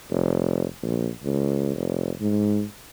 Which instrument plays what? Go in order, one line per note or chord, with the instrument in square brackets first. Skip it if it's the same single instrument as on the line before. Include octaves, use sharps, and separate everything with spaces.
[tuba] F1
A#1
C#2
F1
G#2